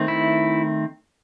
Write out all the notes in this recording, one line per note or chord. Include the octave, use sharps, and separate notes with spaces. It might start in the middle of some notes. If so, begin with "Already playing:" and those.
Already playing: D#3 A3 C4
E4